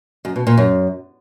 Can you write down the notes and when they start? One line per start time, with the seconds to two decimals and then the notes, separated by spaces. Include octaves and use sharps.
0.25 F#2
0.36 B2
0.47 A#2
0.58 F#2